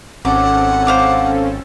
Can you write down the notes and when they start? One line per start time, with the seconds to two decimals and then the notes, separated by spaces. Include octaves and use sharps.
0.25 G#1 C4 C#4 A4 F#5 D6
0.87 C5 F5 D6